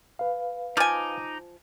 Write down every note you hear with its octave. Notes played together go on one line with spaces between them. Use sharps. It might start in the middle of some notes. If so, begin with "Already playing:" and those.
B4 F5
F3 D#4 G#5 D6